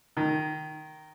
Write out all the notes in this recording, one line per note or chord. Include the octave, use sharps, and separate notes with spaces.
D#3